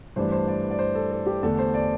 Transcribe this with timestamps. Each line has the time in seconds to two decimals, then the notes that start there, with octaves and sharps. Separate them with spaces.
0.16 G2 E3 A3 D4 C5
0.32 C5
0.48 D5
0.71 D5
0.79 C5
0.95 A4
1.11 A4
1.26 G4
1.43 E2 D3 A3 D4 A4
1.59 C5
1.74 D5